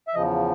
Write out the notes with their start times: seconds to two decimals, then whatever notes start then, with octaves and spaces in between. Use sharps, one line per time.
0.08 E5
0.15 E2 C#3 F3 D#5